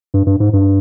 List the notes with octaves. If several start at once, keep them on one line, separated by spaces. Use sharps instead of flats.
G2
G2
G#2
G2